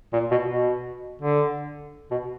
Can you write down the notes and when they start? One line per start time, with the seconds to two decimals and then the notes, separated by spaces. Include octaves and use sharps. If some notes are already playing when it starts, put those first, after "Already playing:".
0.13 A#2
0.31 B2
0.49 B2
1.21 D3
2.11 B2